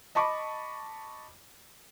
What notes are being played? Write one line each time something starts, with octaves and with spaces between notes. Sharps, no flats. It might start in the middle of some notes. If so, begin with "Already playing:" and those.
D#5 A5 B5 C#6 D6